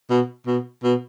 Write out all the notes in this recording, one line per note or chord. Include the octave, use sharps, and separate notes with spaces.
B2
B2
B2